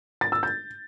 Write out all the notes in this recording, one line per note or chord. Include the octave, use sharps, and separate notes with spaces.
A6
E6
G6